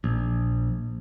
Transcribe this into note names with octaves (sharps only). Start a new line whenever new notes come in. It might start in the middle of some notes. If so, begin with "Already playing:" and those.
A#1